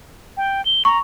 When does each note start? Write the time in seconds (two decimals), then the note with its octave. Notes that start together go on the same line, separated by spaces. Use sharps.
0.37 G5
0.65 G7
0.85 A#5 C#6